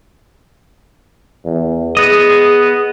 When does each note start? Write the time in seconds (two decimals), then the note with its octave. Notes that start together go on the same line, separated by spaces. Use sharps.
1.45 E2
1.97 B3 G#4 D#5